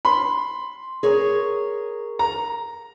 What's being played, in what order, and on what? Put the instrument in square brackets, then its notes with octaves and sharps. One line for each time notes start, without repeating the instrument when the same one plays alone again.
[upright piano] B5 C6
[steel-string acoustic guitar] G#4 A#4 C#5
[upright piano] A#5